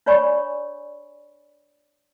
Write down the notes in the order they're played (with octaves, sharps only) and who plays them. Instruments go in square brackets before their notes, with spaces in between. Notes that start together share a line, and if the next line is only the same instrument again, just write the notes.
[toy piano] D4 C#5 D5 G#5 B5 C#6